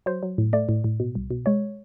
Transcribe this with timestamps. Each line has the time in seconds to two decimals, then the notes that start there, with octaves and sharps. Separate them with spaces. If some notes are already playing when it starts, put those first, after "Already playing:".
0.06 F#3 C5
0.23 F#3
0.38 A2
0.53 A3 D5
0.69 A2
0.84 A2
1.00 B2
1.15 C2
1.31 B2
1.46 G#3 C#5